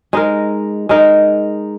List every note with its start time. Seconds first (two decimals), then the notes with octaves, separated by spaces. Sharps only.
0.13 G#3 D#4 A#4
0.89 G#3 D#4 A#4